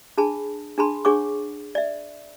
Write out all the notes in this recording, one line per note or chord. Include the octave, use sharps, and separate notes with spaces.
D4 G#4 A5 B5
D4 G#4 A5 B5 C6
D4 G#4 C#5 F#5 C#6 D6
D5 E5